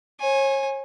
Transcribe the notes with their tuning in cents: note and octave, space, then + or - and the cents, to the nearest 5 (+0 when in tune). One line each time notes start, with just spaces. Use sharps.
C#5 -35 G#5 +0